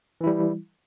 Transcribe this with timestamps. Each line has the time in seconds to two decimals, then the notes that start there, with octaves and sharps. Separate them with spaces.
0.21 E3
0.24 E4
0.27 G3